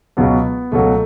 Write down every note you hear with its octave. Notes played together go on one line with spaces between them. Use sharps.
C#2 B2 F#3 B3
C#2 B2 F#3 A3